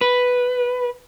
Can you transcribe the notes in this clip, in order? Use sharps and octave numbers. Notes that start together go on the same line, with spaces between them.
B4